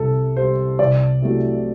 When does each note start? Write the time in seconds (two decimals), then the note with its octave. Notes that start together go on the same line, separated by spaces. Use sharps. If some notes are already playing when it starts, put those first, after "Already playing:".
Already playing: C2 C3 G3 A4
0.36 C3 G3 C5
0.79 C2 D5
1.22 C3 F#3 A3 E4